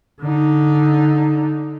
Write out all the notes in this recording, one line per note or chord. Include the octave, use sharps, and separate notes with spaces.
D3 D#4